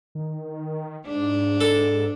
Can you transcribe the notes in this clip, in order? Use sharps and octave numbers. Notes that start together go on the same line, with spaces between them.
D#3
G#2 D4
A4